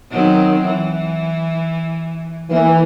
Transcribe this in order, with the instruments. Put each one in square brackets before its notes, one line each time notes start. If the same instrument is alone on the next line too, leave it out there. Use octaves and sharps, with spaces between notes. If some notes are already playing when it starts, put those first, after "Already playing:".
[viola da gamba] D#3 F#3 C4
E3
[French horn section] E3 [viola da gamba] A#3